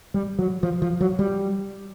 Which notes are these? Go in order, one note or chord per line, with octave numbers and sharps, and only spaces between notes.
G3
F#3
F3
F3
F#3
G3